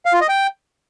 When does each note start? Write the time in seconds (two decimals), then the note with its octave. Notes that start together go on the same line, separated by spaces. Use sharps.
0.06 F5
0.13 F4
0.21 D#5
0.29 G5